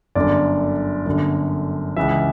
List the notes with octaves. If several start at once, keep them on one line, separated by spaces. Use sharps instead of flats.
G1 F#2 D3 D5
G1 F#2 D3
C#2 C#3 E3 E5